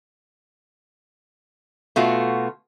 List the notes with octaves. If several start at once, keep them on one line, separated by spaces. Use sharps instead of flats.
B2 A3 F4 F#4